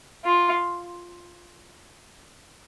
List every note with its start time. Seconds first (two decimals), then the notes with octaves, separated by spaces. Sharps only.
0.25 F4